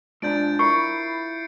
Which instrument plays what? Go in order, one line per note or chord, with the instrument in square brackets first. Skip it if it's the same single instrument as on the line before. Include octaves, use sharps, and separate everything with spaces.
[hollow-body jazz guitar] G#2 D4 [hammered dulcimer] F3 A#5 [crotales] G6 A6 D7
[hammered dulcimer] E4 B5 [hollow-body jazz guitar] A#4 [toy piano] C#6 [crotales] C7 C#7